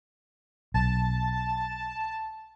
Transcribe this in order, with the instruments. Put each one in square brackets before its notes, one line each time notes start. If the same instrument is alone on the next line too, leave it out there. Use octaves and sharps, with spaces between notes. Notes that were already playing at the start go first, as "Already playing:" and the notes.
[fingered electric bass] B1 [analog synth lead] A5